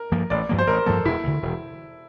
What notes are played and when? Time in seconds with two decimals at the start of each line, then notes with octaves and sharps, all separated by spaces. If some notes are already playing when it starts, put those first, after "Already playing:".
Already playing: A#4
0.12 G2 F3 A#3
0.30 A1 D5
0.49 G2 F3 A#3
0.59 C5
0.67 A1 A#4
0.86 G2 F3 A#3 A4
1.05 E1 E4
1.24 D2 D3
1.42 E1